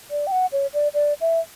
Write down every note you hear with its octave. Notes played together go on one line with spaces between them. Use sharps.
D5
G5
F#5
C#5
D5
D5
E5